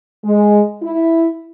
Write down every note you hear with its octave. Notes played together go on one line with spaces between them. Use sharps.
G#3
E4